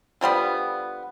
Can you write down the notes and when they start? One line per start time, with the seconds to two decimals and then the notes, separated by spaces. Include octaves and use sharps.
0.21 D3 F3 G3 B3